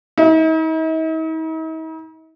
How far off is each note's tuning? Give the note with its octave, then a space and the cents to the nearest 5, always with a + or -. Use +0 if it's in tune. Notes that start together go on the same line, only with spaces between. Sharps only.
D#4 +45